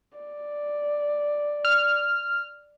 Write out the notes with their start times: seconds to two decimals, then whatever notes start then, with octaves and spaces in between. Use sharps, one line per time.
0.18 D5
1.65 F6